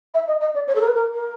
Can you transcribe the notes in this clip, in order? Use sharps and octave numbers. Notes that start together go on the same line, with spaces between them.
E5
D#5
D#5
D5
C#5
A4
A#4
B4
A#4
A#4